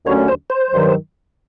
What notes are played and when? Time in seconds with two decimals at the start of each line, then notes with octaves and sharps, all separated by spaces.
0.06 D#2 D3 F#3 A3 C#4 C#5
0.28 C5
0.50 C5
0.71 G2 D#3 F#3